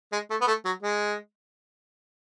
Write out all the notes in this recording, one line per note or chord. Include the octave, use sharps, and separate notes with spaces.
G#3
A3
B3
A3
F#3
G#3